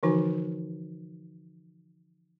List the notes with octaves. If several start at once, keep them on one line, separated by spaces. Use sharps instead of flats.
D3 E3 F3 D#4 F#4 G#5